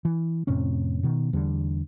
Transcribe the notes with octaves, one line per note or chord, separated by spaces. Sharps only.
E3
F2 A2 C3 C#4
B2 D#3
E2 D3 G3